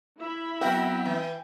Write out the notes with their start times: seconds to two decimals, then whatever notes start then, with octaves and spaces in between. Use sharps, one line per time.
0.19 E4 E5 B5
0.61 F#3 B3 C4 F#4 A#4 G5
1.05 E3